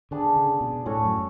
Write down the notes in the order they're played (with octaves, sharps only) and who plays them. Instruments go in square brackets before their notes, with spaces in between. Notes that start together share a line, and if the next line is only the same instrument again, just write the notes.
[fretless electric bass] D3 [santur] B3 D4 G#4
[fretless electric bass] C#3
B2
[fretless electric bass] A2 [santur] C#4 F#4 A4 C#5
[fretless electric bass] F#2